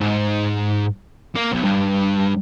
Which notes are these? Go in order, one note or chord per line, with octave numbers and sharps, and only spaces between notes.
G#2
A#3
B1
G2